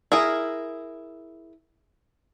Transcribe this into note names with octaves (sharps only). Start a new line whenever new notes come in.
E4 G#4 A#4